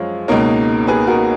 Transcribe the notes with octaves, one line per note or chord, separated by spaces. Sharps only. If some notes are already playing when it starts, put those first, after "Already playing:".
Already playing: F#2 F3 G#3 C#5 F5
C#2 B2 A#3 D#4 A#4 C#5
G#4 B4
F#4 A#4